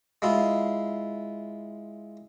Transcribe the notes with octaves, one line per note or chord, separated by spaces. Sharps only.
G#3 E4 F4